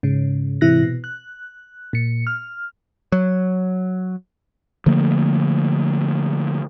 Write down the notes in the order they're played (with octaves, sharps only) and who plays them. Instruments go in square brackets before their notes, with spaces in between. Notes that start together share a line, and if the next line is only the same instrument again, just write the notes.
[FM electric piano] G#2 C#3
G#2 C3 E3 E4 F#6 A#6
B2
F#6
A#2 C#7
F6
[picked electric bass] F#3
[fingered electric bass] D3 F3 A3 A#3